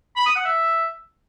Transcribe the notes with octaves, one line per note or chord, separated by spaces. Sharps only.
B5
D#6
F#5
E5